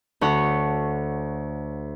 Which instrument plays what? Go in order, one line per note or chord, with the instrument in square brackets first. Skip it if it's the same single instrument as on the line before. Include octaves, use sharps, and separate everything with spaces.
[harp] D2 A4 C#5 F#5